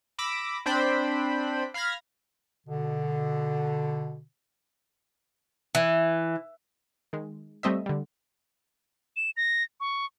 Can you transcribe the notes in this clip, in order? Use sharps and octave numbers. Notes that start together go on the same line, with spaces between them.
B5 D6 E6 A#6
C4 D4 C5 G5 B5
F5 B5 F6 G#6 A#6
B2 D3
E3
D#3 G#3
G3 A3 C4 D#5 E5
D3 G3
E7
A#6
C#6